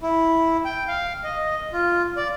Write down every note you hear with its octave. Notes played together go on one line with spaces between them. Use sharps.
E4
G5
F5
D#5
F4
D5